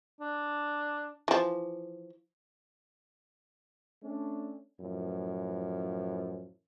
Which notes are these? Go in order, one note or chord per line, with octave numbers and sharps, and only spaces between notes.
D4
E3 F3
A3 C#4 D4
F#2 A2 E3 F3